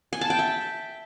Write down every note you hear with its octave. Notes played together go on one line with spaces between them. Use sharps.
G#5
A5
G5
E5